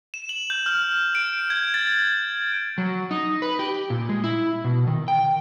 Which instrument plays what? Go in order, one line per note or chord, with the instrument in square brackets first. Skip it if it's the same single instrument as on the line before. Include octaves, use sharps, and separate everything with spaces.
[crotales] E7
F#7
G6
F6
F#7
D7
G#6
A6
[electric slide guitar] F#3
D#4
B4
G4
A#2
G#3
E4
B2
D#3
G5